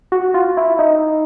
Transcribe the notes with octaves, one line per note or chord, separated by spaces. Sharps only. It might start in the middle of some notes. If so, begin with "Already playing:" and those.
F#4
F4
E4
D#4